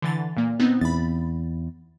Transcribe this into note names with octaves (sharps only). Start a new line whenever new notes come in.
D3 E3 A6
A#2 A#3
B3 C4 D#4
E2 B5 A6